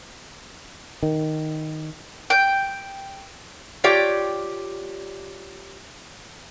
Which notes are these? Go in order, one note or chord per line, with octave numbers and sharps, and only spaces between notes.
D#3
G5
F4 G4 C#5 D5 G5